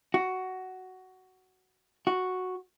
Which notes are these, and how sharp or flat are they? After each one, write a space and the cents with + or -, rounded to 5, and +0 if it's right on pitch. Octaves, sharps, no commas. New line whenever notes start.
F#4 +10
F#4 -5